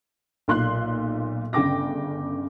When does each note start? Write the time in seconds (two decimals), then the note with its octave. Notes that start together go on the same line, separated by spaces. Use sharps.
0.48 B1 A#2 C6 F#6
1.53 G1 C#3 G5 D6 A#6